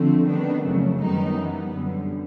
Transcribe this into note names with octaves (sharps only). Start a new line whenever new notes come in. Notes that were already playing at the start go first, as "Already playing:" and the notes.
Already playing: D3 F3 A3 C4
D#3 G3 B3 D4
F2 C#3 F#3 A3
F#2 D#3 G3 B3 D#4
E3 G3 B3
F#2 D3 G3